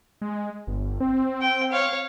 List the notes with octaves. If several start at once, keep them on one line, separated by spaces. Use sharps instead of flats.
G#3
G1
C4
G5
C#5 F5